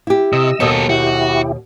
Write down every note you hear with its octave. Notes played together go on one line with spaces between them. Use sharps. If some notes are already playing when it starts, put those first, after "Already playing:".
E4 G4
C3 D#5 E6
D#2 B2 B3 A4
E4 F#4 G4